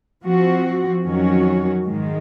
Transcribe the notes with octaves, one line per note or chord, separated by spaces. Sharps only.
F3 C4 F#4
F2 D#3 F#3 C#4 F#4
G#2 D#3 G#3